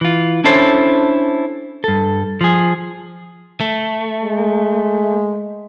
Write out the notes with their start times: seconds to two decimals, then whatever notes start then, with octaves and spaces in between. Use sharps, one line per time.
0.01 E3 F4
0.44 C#4 D4 E4 A4 C5 C#5
1.84 G2 A4
2.41 F3 G#4
3.61 A3
4.23 G#3